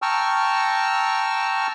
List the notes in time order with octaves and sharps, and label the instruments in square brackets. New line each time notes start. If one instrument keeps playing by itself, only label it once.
[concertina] G5 A5 A#5 C#6 E6 F6